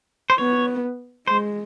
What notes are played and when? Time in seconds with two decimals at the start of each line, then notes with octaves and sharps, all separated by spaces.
0.30 C5
0.38 B3 C#5
1.27 G#3 C5